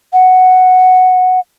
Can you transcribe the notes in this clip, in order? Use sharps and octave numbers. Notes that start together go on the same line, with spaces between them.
F#5